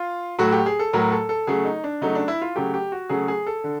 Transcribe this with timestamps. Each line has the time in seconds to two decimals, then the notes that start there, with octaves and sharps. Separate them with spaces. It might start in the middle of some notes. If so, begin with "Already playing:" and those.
Already playing: F4
0.39 A2 F#3 A3 F#4
0.52 G4
0.66 G#4
0.79 A4
0.93 A2 F#3 A3 A#4
1.11 A4
1.29 A4
1.47 C#3 F#3 A3 G#4
1.65 D#4
1.84 D4
2.01 C#3 F#3 A3 D#4
2.15 D4
2.28 E4
2.42 F4
2.56 C#3 F#3 A3 G4
2.74 G4
2.92 F#4
3.09 C#3 F#3 A3 G#4
3.28 G#4
3.46 A4
3.64 D3